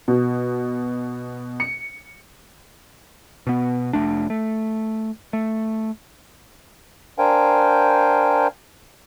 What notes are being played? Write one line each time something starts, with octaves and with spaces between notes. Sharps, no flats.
B2
C#7
B2 B3
F1 G2 A3 D4
A3
A3
D4 A#4 C5 F5 G5 G#5